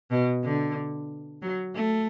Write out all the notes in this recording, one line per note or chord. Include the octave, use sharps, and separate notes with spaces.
B2
D3
F#3
A3